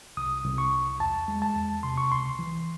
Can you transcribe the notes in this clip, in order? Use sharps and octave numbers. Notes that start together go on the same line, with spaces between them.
C2 D#6
C2
C#6
C2
E2 A5
G#3
A5
E2
C3 C6
C#6
C#2 C6
E3